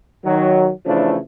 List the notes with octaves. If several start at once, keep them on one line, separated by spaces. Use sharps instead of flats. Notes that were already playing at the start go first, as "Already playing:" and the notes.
D#3 F#3
C#3 E3 F3 A3 C#4 D4